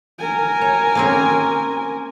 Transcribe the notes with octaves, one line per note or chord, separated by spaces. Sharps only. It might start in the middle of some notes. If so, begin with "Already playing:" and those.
A#4 G#5
C#5
A#3 C4 C#4